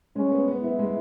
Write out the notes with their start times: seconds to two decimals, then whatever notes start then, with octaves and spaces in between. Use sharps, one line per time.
0.16 G#3 C#4
0.32 B3
0.48 B3
0.63 B3 E4
0.79 G#3